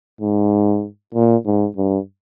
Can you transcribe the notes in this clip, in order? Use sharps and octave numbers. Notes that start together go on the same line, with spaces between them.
G#2
A#2
G#2
G2